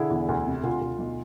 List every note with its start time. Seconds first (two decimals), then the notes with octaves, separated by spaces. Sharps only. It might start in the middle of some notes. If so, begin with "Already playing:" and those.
Already playing: D3 E4 G#4
0.10 E2
0.28 D2
0.47 C3
0.63 D2 F4
0.81 D2
0.99 B1